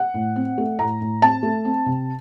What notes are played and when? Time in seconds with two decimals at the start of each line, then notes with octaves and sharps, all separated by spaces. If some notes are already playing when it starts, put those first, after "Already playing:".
Already playing: F#5
0.14 A2
0.36 C4
0.58 A3
0.79 A2 A#5
1.01 A2
1.22 C4 A5
1.43 A3
1.65 C4
1.86 C3